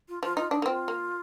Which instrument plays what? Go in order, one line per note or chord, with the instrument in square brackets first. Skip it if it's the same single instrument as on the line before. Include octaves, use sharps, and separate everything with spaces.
[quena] F4
[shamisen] F3 [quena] F4
[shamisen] D#4 [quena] F4
[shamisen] D4 [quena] D#4
[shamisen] A#3
[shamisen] C4 [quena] F4
[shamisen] A#3